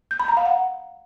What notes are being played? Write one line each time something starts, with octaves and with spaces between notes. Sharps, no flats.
G6
B5
A#5
F5
F#5